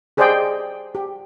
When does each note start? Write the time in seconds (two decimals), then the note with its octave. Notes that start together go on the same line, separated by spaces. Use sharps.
0.17 G4 G#4 C5 D5 D#5 G5
0.95 G4